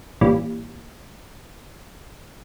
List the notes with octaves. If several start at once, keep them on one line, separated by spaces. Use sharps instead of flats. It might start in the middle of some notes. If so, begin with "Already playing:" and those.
A1 A#2 E3 G3